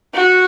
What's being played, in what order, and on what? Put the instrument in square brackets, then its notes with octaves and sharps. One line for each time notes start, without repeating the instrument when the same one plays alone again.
[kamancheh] F#4